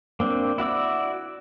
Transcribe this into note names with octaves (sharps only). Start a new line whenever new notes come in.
A#3 C4 D4
E4 F#4 D5 E6